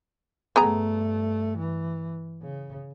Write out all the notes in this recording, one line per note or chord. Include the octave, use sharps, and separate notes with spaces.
G2 A3 B3 G#4 A#5
E3
C#3